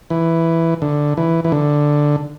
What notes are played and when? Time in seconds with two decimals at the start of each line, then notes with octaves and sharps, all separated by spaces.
0.10 E3
0.82 D3
1.17 E3
1.45 E3
1.52 D3